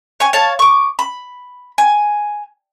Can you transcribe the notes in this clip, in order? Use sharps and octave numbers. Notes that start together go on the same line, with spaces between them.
C#5 G#5
C#5 F5 A5
C#6 D6
B5
G#5